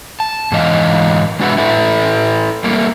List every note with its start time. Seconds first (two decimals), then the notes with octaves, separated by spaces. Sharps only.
0.20 A5
0.52 G#2 E3 D#5 F5
1.39 G#3 D4 F#4 B4 E5 F#5
1.58 E4 A4 B4 E5
2.64 G3 A3 A#3